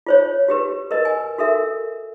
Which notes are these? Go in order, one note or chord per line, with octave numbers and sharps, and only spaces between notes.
F4 C5 C#5
F#4 G4 B4
A#4 B4 D#5
G#5
F#4 A4 A#4 E5